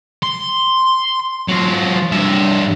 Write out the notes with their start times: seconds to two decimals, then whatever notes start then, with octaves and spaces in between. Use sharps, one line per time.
0.23 C6
1.48 F#3 F4
2.12 G2 E5